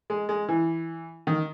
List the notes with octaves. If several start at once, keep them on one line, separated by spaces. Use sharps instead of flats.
G#3
G#3
E3
D#3